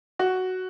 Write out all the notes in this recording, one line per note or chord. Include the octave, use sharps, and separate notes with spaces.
F#4